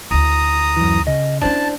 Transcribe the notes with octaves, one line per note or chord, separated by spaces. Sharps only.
D2 E4 A#5 D#6
F#2 E3
C#3 D#5
C#4 D4 E4 C5 A5